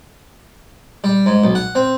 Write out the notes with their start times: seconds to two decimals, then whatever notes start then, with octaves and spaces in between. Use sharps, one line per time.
1.04 G3
1.26 G#2
1.44 B1
1.55 F#5
1.75 C4